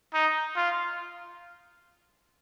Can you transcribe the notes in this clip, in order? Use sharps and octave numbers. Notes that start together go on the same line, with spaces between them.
D#4
F4